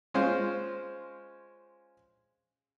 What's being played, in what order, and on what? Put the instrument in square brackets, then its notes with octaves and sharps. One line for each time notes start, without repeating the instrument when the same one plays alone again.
[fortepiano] G#3 C#4 F4 C5